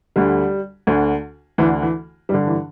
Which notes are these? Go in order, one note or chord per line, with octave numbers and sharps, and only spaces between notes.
D2 D3 G3
D2 D3
D2 D3 E3
E3
G2 D3 G3
E3